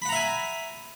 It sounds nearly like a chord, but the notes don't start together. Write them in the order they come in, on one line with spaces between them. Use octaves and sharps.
B5 F#5 A#5 E5 G#5